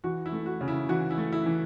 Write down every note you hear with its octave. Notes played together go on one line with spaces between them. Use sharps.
E3 F#4
E4
A3
F#4
C#3
E4
E3 F#4
E4
A3
E4
E3